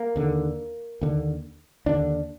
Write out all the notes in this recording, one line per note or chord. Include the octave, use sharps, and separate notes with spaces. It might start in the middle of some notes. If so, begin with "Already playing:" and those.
Already playing: A#3
D#2 D3
D#2 D3
D#2 D3 D4